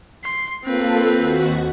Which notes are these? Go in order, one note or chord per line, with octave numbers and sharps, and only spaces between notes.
C6
A#3 C4 F4 A4 B4
D#2 F#4